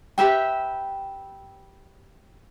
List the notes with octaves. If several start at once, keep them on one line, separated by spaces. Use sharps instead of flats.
G4 B4 E5 G5